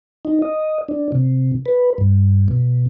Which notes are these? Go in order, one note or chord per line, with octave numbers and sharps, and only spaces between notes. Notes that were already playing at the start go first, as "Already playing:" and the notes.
D#4
D#5
D4
C3
B4
G2
B2